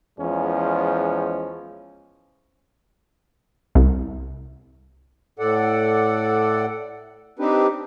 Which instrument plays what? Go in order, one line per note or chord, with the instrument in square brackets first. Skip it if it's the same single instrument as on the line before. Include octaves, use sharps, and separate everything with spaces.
[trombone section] E2 F3 G#3 C#4
[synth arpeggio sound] C2
[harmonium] A2 A4 D5 F#5
C4 D4 D#4 G4 B4